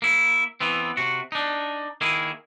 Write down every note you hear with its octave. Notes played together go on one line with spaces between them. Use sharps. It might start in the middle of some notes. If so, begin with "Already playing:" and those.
A#3 E4
E3 B3 C4
C3 F#4
D4 D#4
D#3 A#3 E4 G#4